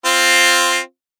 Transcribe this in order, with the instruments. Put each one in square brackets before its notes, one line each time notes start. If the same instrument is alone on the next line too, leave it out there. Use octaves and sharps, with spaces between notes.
[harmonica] C4 F4